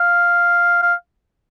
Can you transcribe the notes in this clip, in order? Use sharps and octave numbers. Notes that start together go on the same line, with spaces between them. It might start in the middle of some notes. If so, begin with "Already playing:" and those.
Already playing: F5
F5